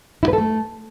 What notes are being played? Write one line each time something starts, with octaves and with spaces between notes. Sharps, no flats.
E4
B4
A4
A3